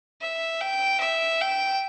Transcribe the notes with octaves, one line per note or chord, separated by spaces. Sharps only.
E5
G5
E5
G5